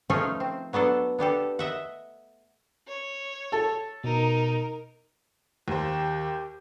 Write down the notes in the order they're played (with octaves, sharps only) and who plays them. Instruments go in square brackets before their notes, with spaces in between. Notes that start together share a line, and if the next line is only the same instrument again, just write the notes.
[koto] F3 A3 C#4 D#4 G#4 C#5
C4
F#3 B3 D4 A4
B3 D4 G4 A4
D#5 E5 F#5
[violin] C#5
[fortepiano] A4
[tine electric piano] B2 [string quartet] D#4 [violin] A#4
[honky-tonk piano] D#2 C5 [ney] G4